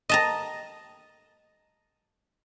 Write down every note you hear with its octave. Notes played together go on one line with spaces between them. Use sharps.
D#5 A5 A#5